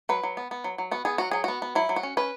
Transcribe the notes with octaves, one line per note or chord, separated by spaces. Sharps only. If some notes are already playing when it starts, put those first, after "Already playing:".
F#3 B4
F#3
B3
B3
F#3
F#3
B3 F#4
B3 G#4
F#3 F#4
F#3 G#4
B3 F#4
B3
F#3 E4
F#3
F#4
C#4
C#4 B4